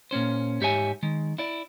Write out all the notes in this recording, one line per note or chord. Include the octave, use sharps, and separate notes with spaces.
A#2 A#3 C#4 C5
G#2 G4 C#5 E5 G#5
D#3 G#3
E4 D5